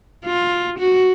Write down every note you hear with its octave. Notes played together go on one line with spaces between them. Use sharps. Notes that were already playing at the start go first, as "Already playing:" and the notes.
F4
F#4